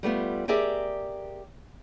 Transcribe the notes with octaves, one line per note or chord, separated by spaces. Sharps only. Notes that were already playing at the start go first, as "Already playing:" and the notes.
G3 A3 B3 F4
G4 G#4 A#4 D5 E5